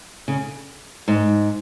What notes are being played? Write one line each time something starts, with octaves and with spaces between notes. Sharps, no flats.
C#3
G#2